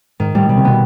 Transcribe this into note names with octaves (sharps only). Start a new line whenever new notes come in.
G#2 D#3
A2 G3
B2 G3
C3
B2 B3